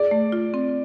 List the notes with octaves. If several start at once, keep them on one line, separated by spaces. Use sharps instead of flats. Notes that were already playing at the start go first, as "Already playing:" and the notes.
Already playing: G#4 D5
A3
F4
C4